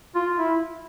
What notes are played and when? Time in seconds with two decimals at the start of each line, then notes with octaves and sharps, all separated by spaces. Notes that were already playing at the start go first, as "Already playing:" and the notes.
0.15 F4
0.39 E4